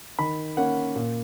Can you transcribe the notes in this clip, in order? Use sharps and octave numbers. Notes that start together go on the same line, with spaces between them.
D#3 B5
A#3 C#4 F#5
A#2